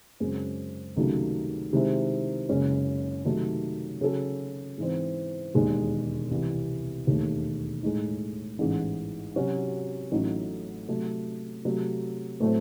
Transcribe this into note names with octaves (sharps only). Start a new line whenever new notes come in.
F#2 C#3 G#3 C4
C#2 C3 D#3 F#3 A3
C3 D#3 G#3 C4 E4
F#1 F#2 C#3 G#3 C#4
C3 D#3 F#3 A3 D#4
C#3 F#3 C#4 F#4 A4
G#2 E3 C4
E1 D#2 D#3 G#3
C2 C3 E3
E1 D#2 D#3 A3
A2 G#3 D#4
A1 G#2 E3
C3 F#3 C#4 F#4
A1 A2 F#3 A3 D#4
C3 F#3 A3
C3 F#3 A3
A2 F#3 A3 C4